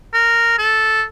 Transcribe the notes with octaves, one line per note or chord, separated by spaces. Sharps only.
A#4
A4